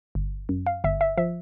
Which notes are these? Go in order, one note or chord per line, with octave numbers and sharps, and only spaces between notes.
G1
F#2
F5
G1 E5
E5
F3 E5